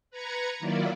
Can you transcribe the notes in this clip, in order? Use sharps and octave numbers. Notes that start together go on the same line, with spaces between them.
B4 A#5 G#6 C#7
D#3 F#3 A#3 E4 F4 D5